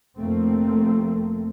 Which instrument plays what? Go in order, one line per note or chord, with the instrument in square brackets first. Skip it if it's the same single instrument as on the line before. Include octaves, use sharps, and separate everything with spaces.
[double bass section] F1 F3 A3 A#3 C4